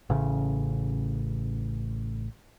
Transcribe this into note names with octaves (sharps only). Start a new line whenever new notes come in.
A1 C#3